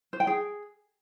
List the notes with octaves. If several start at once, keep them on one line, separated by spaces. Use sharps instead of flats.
C5
G5
G#4